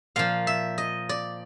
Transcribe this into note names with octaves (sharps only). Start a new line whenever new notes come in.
A#2 F3 F5
E5
D#5
D5